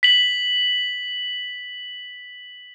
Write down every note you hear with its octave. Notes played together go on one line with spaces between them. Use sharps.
B6 F#7